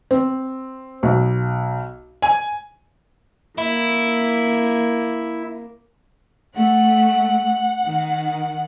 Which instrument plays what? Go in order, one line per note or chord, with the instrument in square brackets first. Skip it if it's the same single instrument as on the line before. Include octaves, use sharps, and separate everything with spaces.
[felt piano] C4
B1
G#5
[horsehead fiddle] A#3 [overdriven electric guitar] E4
[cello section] A3 [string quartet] F#5
[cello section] D#3